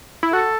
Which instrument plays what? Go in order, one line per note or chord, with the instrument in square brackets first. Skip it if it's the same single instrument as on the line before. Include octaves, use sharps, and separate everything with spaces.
[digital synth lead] E4
[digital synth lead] F#4 [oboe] A4